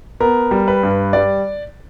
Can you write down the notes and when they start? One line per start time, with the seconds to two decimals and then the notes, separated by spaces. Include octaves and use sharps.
0.20 B3 A#4
0.51 G3
0.68 B4
0.83 G2
1.13 G3 D5